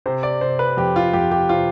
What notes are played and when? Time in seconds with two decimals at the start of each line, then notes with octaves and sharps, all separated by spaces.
0.06 C3 C5
0.23 D5
0.41 C3 C5
0.59 B4
0.77 F2 G4
0.96 F4
1.13 F2 G4
1.31 G4
1.49 C3 F4